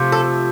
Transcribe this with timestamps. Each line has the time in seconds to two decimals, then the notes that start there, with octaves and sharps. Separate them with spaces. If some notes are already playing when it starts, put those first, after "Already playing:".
Already playing: C3 F3 A3
0.12 A4